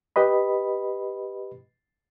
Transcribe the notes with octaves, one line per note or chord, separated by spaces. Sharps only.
G4 B4 D#5 B5